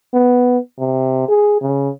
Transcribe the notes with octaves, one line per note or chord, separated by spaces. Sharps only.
B3
C3
G#4
C#3